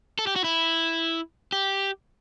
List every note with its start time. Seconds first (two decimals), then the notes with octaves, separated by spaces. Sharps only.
0.19 A4
0.27 G4
0.36 F#4
0.44 E4
1.52 G4